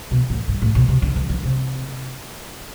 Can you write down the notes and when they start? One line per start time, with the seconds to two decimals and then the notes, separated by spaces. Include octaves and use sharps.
0.11 B2
0.30 A2
0.48 G2
0.62 A2
0.75 B2
0.88 C3
1.02 D3
1.16 E3
1.29 E3
1.43 C3